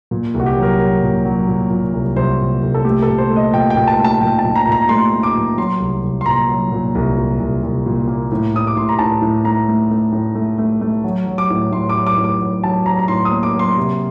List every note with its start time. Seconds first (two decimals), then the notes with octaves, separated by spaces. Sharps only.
0.11 A#2
0.34 C2
0.40 F#4
0.46 G4
0.57 F#3
0.63 A#4
0.81 F#3
1.02 A#2
1.25 F#3
1.48 A#2
1.70 A#2
1.94 C2
2.16 C2 C5
2.39 A#2
2.62 C2
2.74 A4
2.85 A3 G4
3.02 A#2 A4
3.18 C5
3.30 A3
3.36 D#5
3.52 A#2 G5
3.70 A#2 G5
3.87 A5
3.99 A3
4.04 A5
4.21 A#2 G5
4.39 A5
4.44 A#2
4.56 A#5
4.67 A#2
4.72 A#5
4.89 A3 C6
5.13 A3
5.23 D6
5.35 A#2
5.57 F#3 C6
5.80 C2
6.04 C2
6.21 C6
6.26 A#2 A#5
6.48 F#3
6.72 A#2
6.95 C2
7.17 A#2
7.40 C2
7.63 C2
7.86 A#2
8.08 A#3
8.32 A2
8.54 A2 D#6
8.67 D6
8.76 A2 C6
8.89 A#5
8.99 A2 A5
9.21 A2
9.44 A3 A#5
9.68 A3
9.91 A3
10.12 A2
10.35 A3
10.58 A3
10.81 A3
11.04 F#3
11.27 F#3
11.38 D6
11.50 A2
11.72 A2 C6
11.89 D6
11.96 F#3
12.07 D6
12.17 A2
12.24 D6
12.41 F#3
12.63 F#3 A5
12.86 F#3 A#5
12.99 A#5
13.08 A2 C6
13.25 D#6
13.31 A#3
13.43 D6
13.54 F#3
13.59 C6
13.77 C3